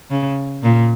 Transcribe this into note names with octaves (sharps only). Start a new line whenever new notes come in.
C#3
A#2